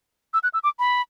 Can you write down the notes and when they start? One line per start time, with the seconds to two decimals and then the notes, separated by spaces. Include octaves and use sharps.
0.34 E6
0.43 F#6
0.54 E6
0.64 D6
0.79 B5